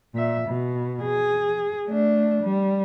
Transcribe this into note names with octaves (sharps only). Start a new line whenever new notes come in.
A#2 E5
B2
G#4
A3 D4
G3